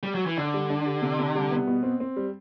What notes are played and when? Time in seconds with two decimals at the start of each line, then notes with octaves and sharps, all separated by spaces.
0.03 G3
0.15 F#3
0.26 E3
0.37 D3 D4
0.54 G3
0.70 D4
0.86 G4
1.02 C3
1.19 C3
1.35 G3
1.51 B3
1.67 B2
1.83 C4
2.00 C4
2.16 G3